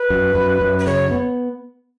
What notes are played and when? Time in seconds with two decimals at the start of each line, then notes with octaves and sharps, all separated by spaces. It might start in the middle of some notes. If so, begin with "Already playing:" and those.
Already playing: B4
0.10 F#2
0.35 F#2
0.61 F#2
0.79 B4
0.87 C#3 C#5
1.11 B3